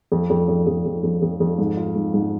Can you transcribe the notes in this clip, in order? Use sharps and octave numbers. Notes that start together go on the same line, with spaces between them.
F2
F2
F2
F2
F2
F2
F2
F2
G#2
F4
G#2
G#2